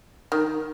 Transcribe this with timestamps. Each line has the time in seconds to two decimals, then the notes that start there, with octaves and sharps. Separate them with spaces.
0.32 D#3